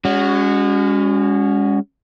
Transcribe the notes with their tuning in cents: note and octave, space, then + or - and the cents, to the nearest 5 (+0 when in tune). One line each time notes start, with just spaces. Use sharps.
G#3 -35 C#4 +15 F#4 +0